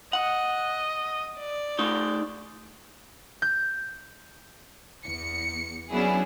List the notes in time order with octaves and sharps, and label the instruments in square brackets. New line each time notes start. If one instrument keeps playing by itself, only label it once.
[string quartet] D#5 [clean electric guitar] F#5
[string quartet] D5
[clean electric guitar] A3 D#4
[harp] G6
[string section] E2 C#7
F#3 B3 C#4 D4 E4 G#4